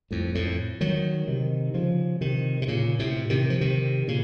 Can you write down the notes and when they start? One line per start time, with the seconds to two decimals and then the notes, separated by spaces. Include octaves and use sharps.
0.11 F2 A2
0.35 F2 A2
0.81 D#3 F#3
1.27 C3 D#3
1.74 C#3 F3
2.21 C3 D#3
2.62 C3
2.68 A#2 C#3
2.99 A2 C3
3.30 C3 D#3
3.50 F3
3.61 C3 D#3
4.08 A#2 C#3